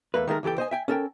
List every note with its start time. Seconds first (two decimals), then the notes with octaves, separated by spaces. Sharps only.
0.14 E2 A3 A#3 B4
0.27 D#3 G#3 A3 A#4
0.43 C#2 E3 G4 A4 G5
0.58 C5 D#5 G#5
0.71 E5 G5 G#5
0.88 C#4 A4 A#4 G5